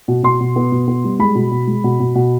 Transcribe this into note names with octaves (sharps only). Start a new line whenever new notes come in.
B2
B2 C6
B2
B3
B2
B3
G3
G#3 B5
B2
B2
G#3
B2
B2
B2